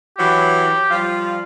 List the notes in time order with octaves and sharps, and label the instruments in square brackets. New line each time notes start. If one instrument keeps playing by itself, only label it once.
[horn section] E3 F#3 [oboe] G4
[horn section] F3 G3 F4